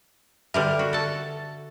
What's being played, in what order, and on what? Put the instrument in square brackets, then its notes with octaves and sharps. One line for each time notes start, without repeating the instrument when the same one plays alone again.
[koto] D3 G3 A#4 [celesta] G4 B4 E5
[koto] F#4
A4 A5